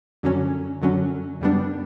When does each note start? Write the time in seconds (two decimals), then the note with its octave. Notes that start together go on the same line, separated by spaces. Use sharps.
0.23 F#2 D3 F#3 C#4
0.82 F#2 D3 F#3 C#4
1.41 F#2 C#3 G3 B3 D4